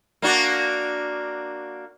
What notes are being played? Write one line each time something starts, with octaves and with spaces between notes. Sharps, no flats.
A#3 D4 F#4